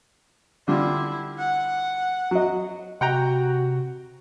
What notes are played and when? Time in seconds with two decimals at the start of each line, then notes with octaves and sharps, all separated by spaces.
0.68 D3 G3 E4 F4
1.38 F#5
2.31 F#3 D#5
3.01 C3 F#4 F#5 G5 A#5